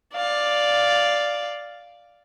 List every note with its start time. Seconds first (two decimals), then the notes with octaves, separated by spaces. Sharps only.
0.16 D5 F5